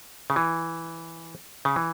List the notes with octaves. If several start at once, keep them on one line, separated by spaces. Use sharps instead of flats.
C#3
E3
C#3
E3